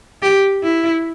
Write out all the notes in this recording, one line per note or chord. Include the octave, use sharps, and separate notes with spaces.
G4
E4